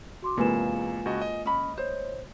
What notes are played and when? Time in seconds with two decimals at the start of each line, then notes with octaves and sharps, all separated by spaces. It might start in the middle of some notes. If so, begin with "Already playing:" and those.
0.22 F#4 C6 D6
0.37 E2 C3 G#3 A#3 F4 B4 G#5 E7
1.05 C#2 F#4 D#5
1.22 D#5
1.45 C#4 D#5 B5
1.78 C5 C#5